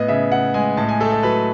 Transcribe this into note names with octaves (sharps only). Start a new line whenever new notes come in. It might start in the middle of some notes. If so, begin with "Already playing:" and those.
Already playing: A2 B3 D#5
C#3 E5
C#3 F#5
G#3 G#5
A2 A5
G#5
A3 A4
A4
F#3 B4